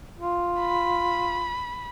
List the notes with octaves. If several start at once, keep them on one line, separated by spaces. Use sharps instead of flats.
F4
B5